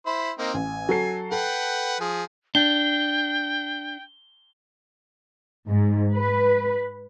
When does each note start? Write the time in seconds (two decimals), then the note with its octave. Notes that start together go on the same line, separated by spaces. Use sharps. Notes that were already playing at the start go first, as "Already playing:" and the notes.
0.06 E4 C5 B5
0.38 A#3 C4 D#4
0.54 A1 G#5
0.89 F#3 A4 C7
1.31 A4 B4 F#5 G5
2.00 F3 G#4
2.55 D4 G5 G7
5.68 G#2
6.15 B4